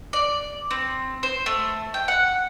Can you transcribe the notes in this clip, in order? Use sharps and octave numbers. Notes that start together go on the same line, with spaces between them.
D5
C4
C5
A3
G5
F#5